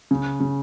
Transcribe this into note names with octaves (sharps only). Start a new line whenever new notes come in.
C#3
C#3